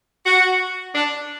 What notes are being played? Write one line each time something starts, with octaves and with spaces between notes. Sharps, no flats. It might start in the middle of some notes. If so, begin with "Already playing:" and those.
F#4
D4